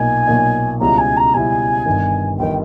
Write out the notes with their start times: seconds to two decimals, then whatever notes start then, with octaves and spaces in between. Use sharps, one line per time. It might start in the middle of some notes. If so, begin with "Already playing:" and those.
Already playing: B1 A#2 A#3 D#4 G#5
0.27 B1 A#2 A#3 D#4
0.80 C#2 B2 G3 C#4 E4 A#5
0.97 G#5
1.16 A#5
1.33 C#2 B2 G3 C#4 E4 G#5
1.86 G1 G2 D#3
2.39 G1 D#3 G5